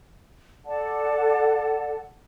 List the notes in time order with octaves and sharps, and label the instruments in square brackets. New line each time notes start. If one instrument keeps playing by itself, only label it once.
[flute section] A4 D5 F#5 A5